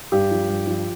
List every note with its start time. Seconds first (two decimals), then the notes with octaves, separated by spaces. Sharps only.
0.12 G2 G4
0.31 F3
0.49 G2
0.67 F3